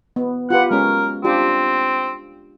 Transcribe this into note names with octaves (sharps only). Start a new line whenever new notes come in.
B3
F4 G4 B4 F#5
G#3 C#4 A#4
C4 D4 F4 G4